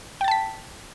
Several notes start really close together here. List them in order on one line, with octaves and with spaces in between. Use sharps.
G5 A6 A5 B6